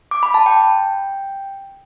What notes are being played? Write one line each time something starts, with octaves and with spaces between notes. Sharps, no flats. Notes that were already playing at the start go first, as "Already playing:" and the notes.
D6
B5
A5
G5